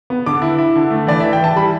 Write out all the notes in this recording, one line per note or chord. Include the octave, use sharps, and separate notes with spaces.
B3
D3 D6
E4
E4
D3
A3
E3 D5
E3 E5
G5
E3 A5
G3 B5